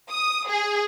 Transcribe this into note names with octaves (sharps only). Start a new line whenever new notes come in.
D#6
G#4